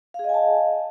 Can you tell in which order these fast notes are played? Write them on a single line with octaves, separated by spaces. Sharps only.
F5 G#4 D#5 G#5 A5